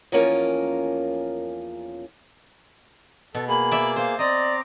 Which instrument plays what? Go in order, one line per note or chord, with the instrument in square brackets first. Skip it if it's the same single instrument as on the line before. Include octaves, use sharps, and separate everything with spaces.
[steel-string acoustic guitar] E2 F3 A#3 C#4 F4 A#4
[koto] B2 [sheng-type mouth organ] A4
[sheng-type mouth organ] A#3 G#4 [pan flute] B5
[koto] D5 E5
[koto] C5 [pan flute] F5
[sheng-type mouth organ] C4 A#5 D6 [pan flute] D5 [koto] D#5